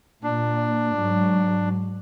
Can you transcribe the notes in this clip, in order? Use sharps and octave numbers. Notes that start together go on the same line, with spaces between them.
A#2 D4
G#2 F#3